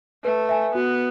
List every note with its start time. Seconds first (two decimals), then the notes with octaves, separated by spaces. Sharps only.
0.24 A3 B4
0.49 E5 G#5
0.75 B3 F#4